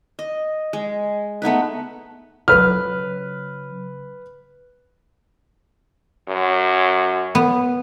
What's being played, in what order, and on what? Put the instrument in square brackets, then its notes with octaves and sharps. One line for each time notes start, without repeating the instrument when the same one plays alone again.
[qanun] D#5
G#3
A3 B3 D#4 B4
[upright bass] C#3 F#3 [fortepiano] B4 F6
[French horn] F#2
[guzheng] B3